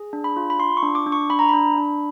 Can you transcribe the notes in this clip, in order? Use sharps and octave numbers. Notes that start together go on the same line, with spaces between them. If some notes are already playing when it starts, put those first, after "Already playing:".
Already playing: G#4
D4
B5
F4
B5
F4 C6
C#6
D4
D6
D4
C#6
D4 B5
A#5
D4 B5
D4